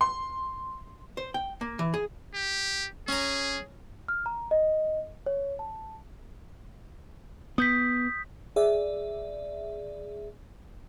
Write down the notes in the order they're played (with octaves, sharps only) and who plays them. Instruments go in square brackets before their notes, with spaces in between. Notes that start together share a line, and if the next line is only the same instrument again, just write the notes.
[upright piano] C6
[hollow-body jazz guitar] C5
G5
A#3
E3
G#4
[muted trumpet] G4
[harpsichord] C#4 A#5 [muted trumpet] G#4
[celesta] F6
A#5
D#5
C#5
A5
[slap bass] B3 [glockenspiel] D#6 G6 B6
[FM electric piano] G#4 D5 E5